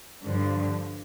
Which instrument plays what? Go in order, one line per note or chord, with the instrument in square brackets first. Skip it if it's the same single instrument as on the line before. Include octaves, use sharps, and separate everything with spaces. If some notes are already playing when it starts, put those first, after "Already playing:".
[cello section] G2 D3 F3